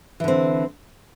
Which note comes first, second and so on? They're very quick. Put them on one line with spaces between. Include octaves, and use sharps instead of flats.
E3 D3 C4